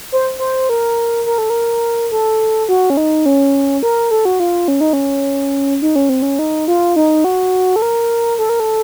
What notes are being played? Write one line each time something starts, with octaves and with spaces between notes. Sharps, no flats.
C5
C5
A#4
A#4
A4
A#4
A4
F#4
C#4
D#4
C#4
A#4
A4
F#4
F4
C#4
D#4
C#4
D#4
C#4
C4
C#4
D#4
F4
D#4
F#4
A4
A#4
A4
A#4
A4